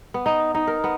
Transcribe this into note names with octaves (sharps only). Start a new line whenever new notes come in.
B3
D#4
D#4
A#4
B3